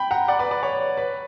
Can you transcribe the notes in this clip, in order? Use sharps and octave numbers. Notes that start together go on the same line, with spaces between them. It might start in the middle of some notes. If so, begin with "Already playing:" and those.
Already playing: G5 B5
F#5 A#5
D5 F#5
B4 D5
B4 D5
C#5
B4